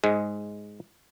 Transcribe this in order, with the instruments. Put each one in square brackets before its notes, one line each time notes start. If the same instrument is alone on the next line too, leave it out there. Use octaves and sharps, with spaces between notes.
[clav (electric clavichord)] G#2 G#3